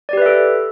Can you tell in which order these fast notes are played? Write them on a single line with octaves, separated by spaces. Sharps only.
D5 G4 B4 E5 A4